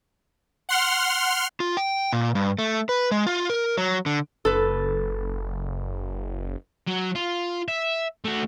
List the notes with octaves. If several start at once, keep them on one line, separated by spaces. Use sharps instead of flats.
F#5 C6 F6
F4
G5
A#2
G2
A3
B4
G#3
F4
A#4
F#3
D3
F#1 A4 B4
F#3
F4
E5
A3 F#4